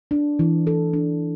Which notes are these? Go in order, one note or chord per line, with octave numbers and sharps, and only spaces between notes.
D4
E3
A4
D4